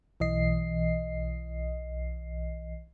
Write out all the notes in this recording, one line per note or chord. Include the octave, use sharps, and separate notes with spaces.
B1 E3 D#5 C7